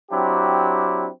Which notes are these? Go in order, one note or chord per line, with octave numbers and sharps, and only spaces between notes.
F#3 C4 D4 E4 G4